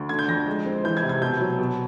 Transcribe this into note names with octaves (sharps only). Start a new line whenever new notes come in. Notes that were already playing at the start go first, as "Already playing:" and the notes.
Already playing: D2
D3 G#6
G6
F2 A#6
G#3
C4
E3 G6
G#6
C3
G#6
B2 G6
F#3
B2